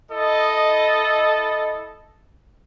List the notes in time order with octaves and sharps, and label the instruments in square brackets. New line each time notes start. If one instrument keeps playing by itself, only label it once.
[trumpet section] E4 A4 D#5